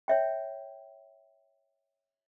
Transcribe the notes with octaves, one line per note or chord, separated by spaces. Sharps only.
C#5 E5 G5